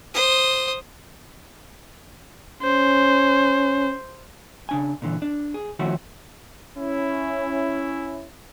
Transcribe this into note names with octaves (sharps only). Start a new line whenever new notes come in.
C5 D#6
C#4 C5
C#3 D4 G#5
A#2 D3 E3
D4
G#4
D#3 F3 A3 C#4 E4 F#4
C#4 E4